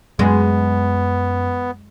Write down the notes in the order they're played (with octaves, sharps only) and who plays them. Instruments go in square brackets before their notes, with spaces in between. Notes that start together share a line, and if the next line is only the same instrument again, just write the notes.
[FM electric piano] F#2 [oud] G#3 [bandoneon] B3